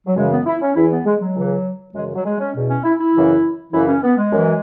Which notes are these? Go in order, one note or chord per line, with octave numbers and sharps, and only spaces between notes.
F#3
F#2 C#3 E3 G#3
B3
E4
C#4
E2 E3 E4
B3
G#3
F#3
C#2 C#3 E3
F#2 C#3 E3 G#3
F#3
G#3
C#4
E2 B2
C#4
E4
E4
F#2 C#3 E3
F#2 C#3 E3 E4
C#4
B3
G#3
F#2 E3